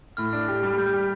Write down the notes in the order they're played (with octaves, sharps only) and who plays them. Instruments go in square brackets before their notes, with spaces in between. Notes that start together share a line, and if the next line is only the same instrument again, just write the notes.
[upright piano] A2 [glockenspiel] F6
[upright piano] D4
G4
G3
[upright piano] G3 [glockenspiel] G6
[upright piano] G4